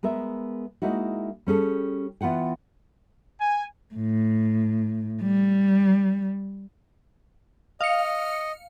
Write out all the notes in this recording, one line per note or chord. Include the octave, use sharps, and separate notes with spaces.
G#3 B3 A#4 E5
G#3 A#3 D#4 E4 F#4
G3 C#4 G#4 A4
E3 B3 F4 F#5 G5
G#5
A2
G3
D#5 F5 C#7